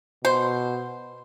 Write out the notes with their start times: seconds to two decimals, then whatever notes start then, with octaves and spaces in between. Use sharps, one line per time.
0.25 B2 C5